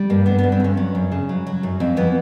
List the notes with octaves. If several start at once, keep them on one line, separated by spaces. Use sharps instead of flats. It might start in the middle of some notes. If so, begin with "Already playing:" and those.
Already playing: G3
G2 A#3
D3 B3
B3
G2
C4
G2 C#4
F#3
F#2
C#3
F#3
F#3
F#2
F2 C4
E3 B3